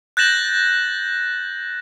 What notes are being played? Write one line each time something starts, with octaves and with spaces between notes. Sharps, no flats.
F#6 G6 A6 A#6 E7 F#7